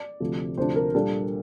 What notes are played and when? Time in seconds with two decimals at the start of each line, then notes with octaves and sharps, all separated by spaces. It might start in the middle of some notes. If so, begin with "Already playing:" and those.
Already playing: D5
0.20 D2 C3 F3 A3
0.57 D2 C3 F3 A3 D4 C5
0.75 A#4
0.94 A#2 G3 A#3 D4 A4